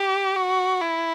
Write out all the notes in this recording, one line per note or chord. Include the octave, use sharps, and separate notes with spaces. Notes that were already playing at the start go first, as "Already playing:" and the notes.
Already playing: G4
F#4
E4